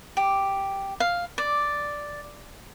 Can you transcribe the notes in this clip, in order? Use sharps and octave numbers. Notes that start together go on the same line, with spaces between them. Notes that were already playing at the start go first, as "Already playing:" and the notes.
G4
F5
D5